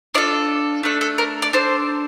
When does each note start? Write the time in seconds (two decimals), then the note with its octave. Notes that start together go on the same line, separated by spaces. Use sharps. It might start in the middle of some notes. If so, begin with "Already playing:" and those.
0.14 D4 F4 A4 D5
0.83 A3 D4 A4
1.01 A4
1.18 A#4
1.42 D5
1.53 D4 A4 C5